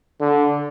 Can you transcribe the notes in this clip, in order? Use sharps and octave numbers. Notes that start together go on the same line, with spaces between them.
D3